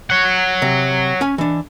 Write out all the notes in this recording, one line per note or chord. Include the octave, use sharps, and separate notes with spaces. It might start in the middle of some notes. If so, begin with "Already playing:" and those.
C#5 F#5
C3
C#4 G#5
E3 D4